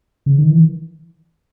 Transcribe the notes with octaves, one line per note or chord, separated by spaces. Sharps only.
C#3
D#3
E3